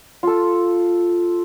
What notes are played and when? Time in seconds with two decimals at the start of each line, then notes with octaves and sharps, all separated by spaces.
0.23 F4 A4